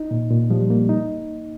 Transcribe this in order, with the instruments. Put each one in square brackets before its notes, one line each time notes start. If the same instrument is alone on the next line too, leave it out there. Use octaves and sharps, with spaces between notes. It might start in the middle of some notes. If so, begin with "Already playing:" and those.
Already playing: [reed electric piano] D#4
A#2
A#2
[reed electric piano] F3 [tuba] G3
[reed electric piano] A#3
D#4